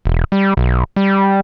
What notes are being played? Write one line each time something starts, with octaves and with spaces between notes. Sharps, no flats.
E1
G3
B1
G3